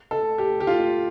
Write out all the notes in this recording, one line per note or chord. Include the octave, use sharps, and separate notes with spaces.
A4
G4
G4
F4